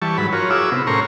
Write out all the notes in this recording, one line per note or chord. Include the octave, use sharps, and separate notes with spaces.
E3 G3 A5 C#6
G#2 F#3 B4 B5
F4 F#4 A#4 C#5
E4 F#4 G#4 D6 E6
C3 B3
A2 C#4 A#4 C5 A#5 C#6